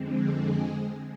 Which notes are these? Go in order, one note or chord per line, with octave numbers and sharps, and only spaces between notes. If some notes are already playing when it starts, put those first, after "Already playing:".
Already playing: F2 D3 G#3 C4
G#3 G#4